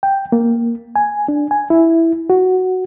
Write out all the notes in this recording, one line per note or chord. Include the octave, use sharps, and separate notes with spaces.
G5
A#3
G#5
D4
G#5
E4
F#4